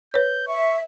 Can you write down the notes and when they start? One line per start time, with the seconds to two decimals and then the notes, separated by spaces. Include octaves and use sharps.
0.14 B4 C#5 G6
0.47 E5 C#6